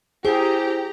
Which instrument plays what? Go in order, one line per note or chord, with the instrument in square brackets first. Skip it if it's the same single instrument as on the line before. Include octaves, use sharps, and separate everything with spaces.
[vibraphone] E4 C5 [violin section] G4 A#5 [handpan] G#4